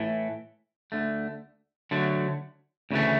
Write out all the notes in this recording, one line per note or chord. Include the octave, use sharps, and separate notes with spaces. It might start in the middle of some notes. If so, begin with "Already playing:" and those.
Already playing: A2 E3 A3
D2 D3 A3
D3 F#3 A3
D2 C#3 E3 A3